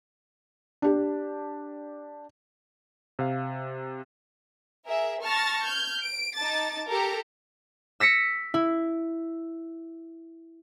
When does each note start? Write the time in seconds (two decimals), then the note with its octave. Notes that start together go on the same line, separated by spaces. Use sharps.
0.82 D4 G4
3.19 C3 F5
4.87 G#4 A#4 E5
5.24 A5 C#6 F6 A6 A#6
5.64 F6 G6 G#6
6.02 D7
6.36 D#4 A5 D6 A6
6.88 G4 A4 A#4 A#5
8.00 E6 A#6 B6 C#7
8.54 E4